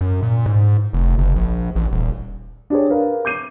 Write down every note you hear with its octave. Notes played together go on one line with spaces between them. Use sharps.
F#2
A#2
G#2
F1
F#1
A#1
A1
D#1
D4 G4 G#4 C#5
A#4 B4 F5
D6 G6 C7 D#7